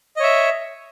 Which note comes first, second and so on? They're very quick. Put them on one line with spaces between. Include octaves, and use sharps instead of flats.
D#5 C#5 E5